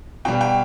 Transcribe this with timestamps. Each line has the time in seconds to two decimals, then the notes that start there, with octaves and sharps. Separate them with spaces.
0.25 B2 G5
0.28 G3
0.41 G5